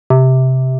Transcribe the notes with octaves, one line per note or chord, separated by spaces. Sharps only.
C3